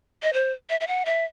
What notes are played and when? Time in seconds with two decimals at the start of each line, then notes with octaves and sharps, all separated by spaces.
0.23 D#5
0.33 C5
0.70 E5
0.80 E5
0.87 F#5
1.05 E5